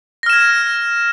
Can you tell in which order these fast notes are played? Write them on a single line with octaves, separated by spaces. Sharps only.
A#6 F6 E7 G#6